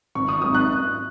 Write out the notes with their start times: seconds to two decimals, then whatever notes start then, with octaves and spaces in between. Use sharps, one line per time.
0.15 G#1 C#6
0.29 D#6
0.41 G#2 F#3 D#6
0.55 F#6